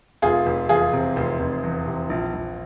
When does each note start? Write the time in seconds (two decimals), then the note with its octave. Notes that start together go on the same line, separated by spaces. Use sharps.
0.22 F1 F4 G#4
0.46 F1
0.69 E2 F4 G#4
0.93 C3
1.16 F1
1.40 F1
1.63 E2
1.87 C3
2.10 A#1
2.33 A#1